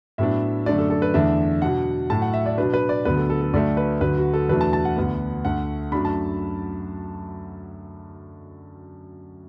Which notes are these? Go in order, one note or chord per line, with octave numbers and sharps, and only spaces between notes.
A2 F#3 B3 D4 E5
F#2 D3 A3 D4 D5
A4
A4
B4
E2 D3 A3 D4 E5
B2 F#3 D4 F#5
A2 F#3 A3 A5
F#5
E5
D5
B2 F#3 D4 B4
B4
D5
D2 D3 F#3 B3 D4 B4
A4
A4
A4
D2 D3 F#3 A3 D5
B4
D2 D3 F#3 B4
F#4
A4
E2 B2 F#3 A3 D4 B4
A5
A5
F#5
D2 D3 B3 D4
D2 D3 A3 F#5
F#2 F#3 A3 D4 B5
A5